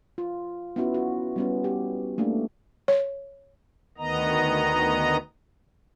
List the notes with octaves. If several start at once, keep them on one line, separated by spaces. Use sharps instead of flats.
F4
B3 C#4 E4 F#4
F#4
G3 B3 C#4
G4
A3 A#3 D4
C#5
D2 D#3 B3 D#5 A#5